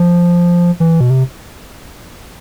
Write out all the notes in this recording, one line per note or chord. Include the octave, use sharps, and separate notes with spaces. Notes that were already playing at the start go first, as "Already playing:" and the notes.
Already playing: F3
E3
B2
C3